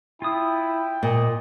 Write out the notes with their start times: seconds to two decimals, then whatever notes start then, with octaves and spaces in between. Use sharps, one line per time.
0.22 E4 F4 G5 D#6
1.03 A#2 D#5